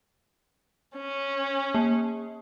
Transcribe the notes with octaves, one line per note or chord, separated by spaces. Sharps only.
C#4
A#3